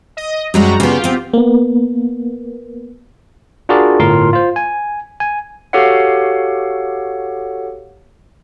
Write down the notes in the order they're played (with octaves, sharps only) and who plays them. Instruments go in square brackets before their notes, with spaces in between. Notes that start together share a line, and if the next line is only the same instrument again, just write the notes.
[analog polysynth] D#5
[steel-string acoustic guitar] F#2 G#3 C#5 [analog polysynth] G3 F#4 A#5
[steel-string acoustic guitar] C#3 B3 [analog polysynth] F4 G4
[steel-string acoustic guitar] B3 C4
[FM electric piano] A#3 B3
[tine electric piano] D4 F4 F#4 G#4 A#4 D5
G1 A2 F4 A#4 F5 C6
F4 C5
G#5
G#5
[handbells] F#4 G4 A4 C#5 F5 F#5